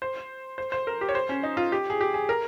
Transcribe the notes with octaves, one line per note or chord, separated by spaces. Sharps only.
C5
C5
C5
A#4
G4
C#5
C5
C#4
D#4
F4
G4
G#4
G4
G#4
A#4